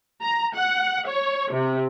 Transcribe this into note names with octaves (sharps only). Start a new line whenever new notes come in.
A#5
F#5
C#5
C3